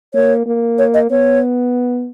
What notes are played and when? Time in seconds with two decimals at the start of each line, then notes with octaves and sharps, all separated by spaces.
0.14 A#3 C#5
0.46 A#3
0.78 C#5
0.94 D#5
1.10 B3 C#5